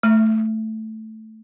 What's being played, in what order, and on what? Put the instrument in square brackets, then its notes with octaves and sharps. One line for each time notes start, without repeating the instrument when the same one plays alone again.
[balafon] A3